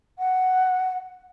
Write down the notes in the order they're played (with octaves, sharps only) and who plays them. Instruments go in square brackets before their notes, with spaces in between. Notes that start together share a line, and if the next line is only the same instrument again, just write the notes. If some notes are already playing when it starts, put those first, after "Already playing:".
[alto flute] F#5